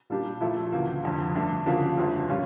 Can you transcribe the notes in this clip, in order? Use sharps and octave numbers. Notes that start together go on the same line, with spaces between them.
A#2 G3 A#3 D4 G4
A#2 F3 A3 E4 A4
D2 C#3 E3 A#3
F1 F2 D3
G2 D3 A3 D4
D2 C#3 F3 A#3 D4
G1 F2 D3 A3
A#2 G3 C#4 F4